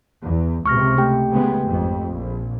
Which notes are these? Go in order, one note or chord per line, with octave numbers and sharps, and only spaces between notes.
E2
C#2 C3 C#6 F6 A#6
A3 G4 G5
C#3 G#3 B3
G#1 F2
A#1